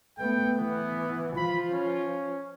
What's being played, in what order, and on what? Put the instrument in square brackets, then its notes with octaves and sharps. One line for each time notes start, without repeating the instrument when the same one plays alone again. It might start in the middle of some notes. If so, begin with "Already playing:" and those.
[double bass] A3 B3 [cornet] G5
[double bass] E3 [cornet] B3
[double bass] F3 [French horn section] F4 [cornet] B5
[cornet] C#4